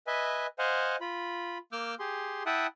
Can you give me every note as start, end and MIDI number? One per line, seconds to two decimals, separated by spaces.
0.07 0.47 71
0.07 0.47 75
0.07 0.47 76
0.07 0.47 80
0.59 0.96 72
0.59 0.96 75
0.59 0.96 77
0.59 0.96 78
0.59 0.96 80
1.01 1.58 65
1.01 1.58 83
1.72 1.95 58
1.72 1.95 86
1.72 1.95 88
1.72 1.95 89
1.72 1.95 91
1.99 2.43 67
1.99 2.43 68
1.99 2.43 84
2.46 2.67 64
2.46 2.67 76
2.46 2.67 78
2.46 2.67 79
2.46 2.67 81
2.46 2.67 87